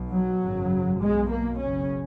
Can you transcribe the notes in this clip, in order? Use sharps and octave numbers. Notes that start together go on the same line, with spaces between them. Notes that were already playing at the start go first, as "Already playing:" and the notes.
Already playing: B1 B2
F#3
G#1 F#2 C#3
B1 B2 G#3
A#3
F#1 F#2 C#3 C#4